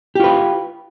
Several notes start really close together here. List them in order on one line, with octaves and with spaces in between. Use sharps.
G4 F4 B4